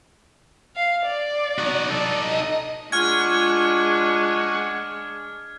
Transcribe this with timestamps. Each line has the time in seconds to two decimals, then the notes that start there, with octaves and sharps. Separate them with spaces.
0.76 F5
1.06 D5
1.58 D#4 F#4
1.91 D#4 A4 D5
2.25 D#5
2.92 G#3 D4 F4 F#5 G#5 C#6 F6 G#6